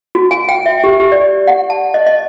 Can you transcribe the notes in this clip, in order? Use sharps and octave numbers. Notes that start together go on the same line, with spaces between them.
F#4
G#5
G5
E5
G4
G4
D5
F#5
A5
D#5
D#5